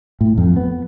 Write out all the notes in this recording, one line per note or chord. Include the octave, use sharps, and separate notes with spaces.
A2
F2
B3